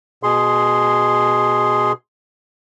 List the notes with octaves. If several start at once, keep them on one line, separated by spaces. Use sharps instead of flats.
B2 G#4 C6